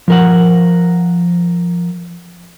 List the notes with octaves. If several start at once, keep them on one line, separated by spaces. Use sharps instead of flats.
F3 A#4 F#5